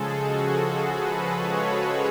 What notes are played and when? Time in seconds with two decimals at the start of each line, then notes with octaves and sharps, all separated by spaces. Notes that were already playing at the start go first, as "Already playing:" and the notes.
Already playing: C#3 F3 G#3 G#4 A4
0.14 F#4
0.93 B4
1.32 C#5
1.70 C#5